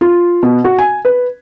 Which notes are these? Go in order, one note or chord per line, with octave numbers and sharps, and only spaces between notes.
F4
B2
F#4
G#5
B4